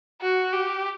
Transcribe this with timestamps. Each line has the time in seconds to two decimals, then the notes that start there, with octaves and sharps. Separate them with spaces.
0.22 F#4
0.53 G4